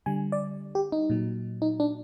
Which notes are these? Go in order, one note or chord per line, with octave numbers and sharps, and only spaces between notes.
D3 G3 G#5
D5
G4
D#4
A#2 F#3
D#4
D4